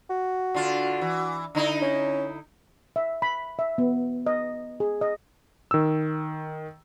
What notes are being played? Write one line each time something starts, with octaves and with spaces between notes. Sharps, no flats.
F#4
D3 F4
E3
D3 D#4 E4
C#4
E5
B5
E5
B3
D#5
G#4
D#5
D#3 E6